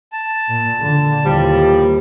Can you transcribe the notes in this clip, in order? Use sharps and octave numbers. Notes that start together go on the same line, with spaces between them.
A5
A#2
D3
D#2 A2 F3 G3